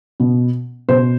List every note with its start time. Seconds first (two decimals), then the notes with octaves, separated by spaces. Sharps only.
0.20 B2
0.89 B2 C5